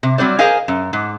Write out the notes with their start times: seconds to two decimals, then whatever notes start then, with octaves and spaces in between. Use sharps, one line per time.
0.03 C3
0.18 F#3 G3 C4 C5 D5
0.39 G#4 A#4 C5 D#5 F5 G#5
0.68 F#2
0.93 G#2